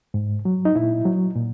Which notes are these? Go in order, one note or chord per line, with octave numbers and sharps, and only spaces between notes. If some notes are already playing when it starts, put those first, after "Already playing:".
G#2
F#3
D#4
A#2 E4
F#3
A#2